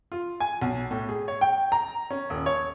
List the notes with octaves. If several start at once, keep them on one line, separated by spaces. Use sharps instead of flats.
F4
G#5
B1
A2
G#4
C#5
G5
A#5
C#4
D#1
C#5